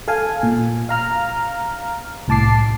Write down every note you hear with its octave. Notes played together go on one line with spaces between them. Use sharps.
A4 F5 G#5
A#2
F5 A#5 F6
C2 A2 A5 D6 C7